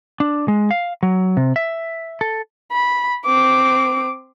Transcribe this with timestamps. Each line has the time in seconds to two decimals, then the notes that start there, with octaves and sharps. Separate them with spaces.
0.20 D4
0.48 G#3
0.71 F5
1.03 F#3
1.37 C3
1.56 E5
2.21 A4
2.72 B5
3.25 C4 D6